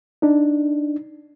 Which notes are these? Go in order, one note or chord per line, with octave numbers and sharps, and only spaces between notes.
D4 D#4